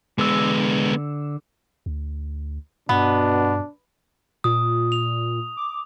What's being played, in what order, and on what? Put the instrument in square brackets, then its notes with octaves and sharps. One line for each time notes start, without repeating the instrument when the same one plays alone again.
[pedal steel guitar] D3 E6 [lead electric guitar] G#3 B3
[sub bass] D2
[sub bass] G2 [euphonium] B2 [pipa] B3 [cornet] D4
[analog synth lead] A#2 [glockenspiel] D#6
[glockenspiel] F7
[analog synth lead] D6